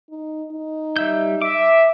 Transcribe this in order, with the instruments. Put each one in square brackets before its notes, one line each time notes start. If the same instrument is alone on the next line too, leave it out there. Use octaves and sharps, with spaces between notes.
[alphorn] D#4
D#4
[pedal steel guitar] G3 E5 G6
[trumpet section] E5 [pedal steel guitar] D6